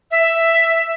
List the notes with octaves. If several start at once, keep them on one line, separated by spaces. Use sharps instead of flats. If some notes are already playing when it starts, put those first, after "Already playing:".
E5